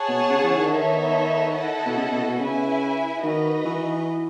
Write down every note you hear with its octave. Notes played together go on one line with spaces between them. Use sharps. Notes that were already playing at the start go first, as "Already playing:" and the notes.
Already playing: G#4 C#5 F#5 A5
B2
C#3
E3
D#3
D#3 B3 D#4 A4 C#5 E5
E4 A4 D#5 F#5 A5
B2
C#3
B2
B2
C#3 E4 B4 E5 G#5
D#3 D#4 F#4 B4 D#5
E3